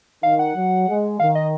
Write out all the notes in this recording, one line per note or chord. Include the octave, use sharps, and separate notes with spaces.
D#3 F5
F#5
F#3
G#3
D#3 F5
D#5